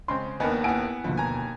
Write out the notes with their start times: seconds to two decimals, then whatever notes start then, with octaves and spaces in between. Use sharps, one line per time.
0.08 C#3 G#3 C4 C6
0.40 D#2 B3 D4 A#4 D#5 G#5 B5
0.64 B3 E4 F#5 G#5 D7
1.04 D2 B2 F3
1.17 D#2 G#5 A#5